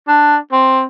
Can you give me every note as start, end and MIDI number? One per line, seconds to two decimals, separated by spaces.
0.08 0.37 62
0.52 0.85 60